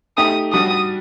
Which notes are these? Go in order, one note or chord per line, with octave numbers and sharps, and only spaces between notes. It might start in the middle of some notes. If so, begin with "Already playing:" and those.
A3 D#4 G4 D#6
G3 D4 F#4 D#6